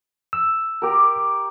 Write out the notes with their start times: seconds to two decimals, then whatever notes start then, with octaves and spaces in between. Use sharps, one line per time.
0.33 E6
0.82 G4 A#4